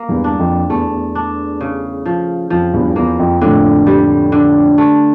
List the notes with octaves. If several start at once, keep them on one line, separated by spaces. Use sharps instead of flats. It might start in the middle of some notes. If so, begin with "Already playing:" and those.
Already playing: A#3
E2 G2
D4
F2
E2 A3
E2
D4
C#3
F3
F2 F3
E2 G2
E2 A#3
F2
F2 A2 D3
G3
D3
A3